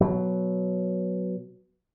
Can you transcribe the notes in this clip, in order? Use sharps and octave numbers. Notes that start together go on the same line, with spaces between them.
B2 F#3